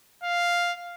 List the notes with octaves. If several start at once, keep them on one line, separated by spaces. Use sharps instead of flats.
F5